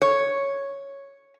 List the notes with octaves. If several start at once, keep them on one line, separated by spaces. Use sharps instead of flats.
C#5